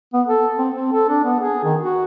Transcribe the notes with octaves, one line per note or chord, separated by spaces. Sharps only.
B3
A4
C4
C4
A4
D4
B3
G#4
D#3
F#4